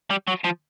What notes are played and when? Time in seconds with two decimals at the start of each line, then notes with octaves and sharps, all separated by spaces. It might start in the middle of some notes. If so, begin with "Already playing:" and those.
0.10 G3
0.28 F#3
0.44 F3